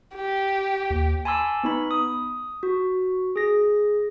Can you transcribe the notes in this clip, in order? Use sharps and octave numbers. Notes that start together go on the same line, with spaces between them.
G4
D#2
G#5 A5 B5 C6 D6 E6
B3 D#4 B5
D#6
F#4
G#4 A#6